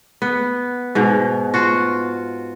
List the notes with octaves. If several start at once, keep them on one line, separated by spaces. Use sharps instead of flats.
B3
G#2 B2
F4 F#4